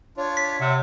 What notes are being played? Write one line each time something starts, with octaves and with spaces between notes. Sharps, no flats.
D4 F4 C#5
B6
C3 E5 F#5